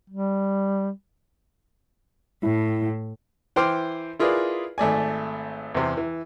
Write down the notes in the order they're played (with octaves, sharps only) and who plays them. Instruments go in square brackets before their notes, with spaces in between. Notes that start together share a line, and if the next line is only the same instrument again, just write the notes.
[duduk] G3
[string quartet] A2 [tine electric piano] E4
[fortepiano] E3 C5 G5 C6 D6 F6
E4 F4 G#4 A#4 B4 D5
G#1 A3 D5 G#5
E2 C3
E3